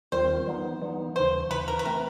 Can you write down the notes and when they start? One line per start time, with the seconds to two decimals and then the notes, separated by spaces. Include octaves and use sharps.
0.12 D#2 D#3 G3 C4 F4 C5
0.46 E3 G3 B3 D#4
0.82 E3 G3 B3 D#4
1.15 D#2 C#3 E3 C5
1.50 D#2 C#3 E3 B4
1.68 A#4
1.79 B4
1.85 E3 A3 C4 A#4